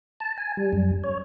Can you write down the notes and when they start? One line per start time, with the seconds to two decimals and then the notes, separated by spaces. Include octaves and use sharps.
0.20 A5
0.38 G#5
0.57 G3
0.72 F#2
1.04 C#5